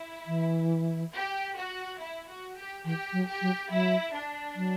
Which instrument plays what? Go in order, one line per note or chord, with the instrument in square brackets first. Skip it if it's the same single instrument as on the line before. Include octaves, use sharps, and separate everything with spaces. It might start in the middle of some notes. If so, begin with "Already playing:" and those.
Already playing: [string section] E4
[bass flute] E3
[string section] G4
F#4
E4
F#4
G4
[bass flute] E3 [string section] G4
[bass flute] F#3
[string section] G4
[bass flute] F#3
[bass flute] F#3 [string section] E4
[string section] D4
[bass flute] F#3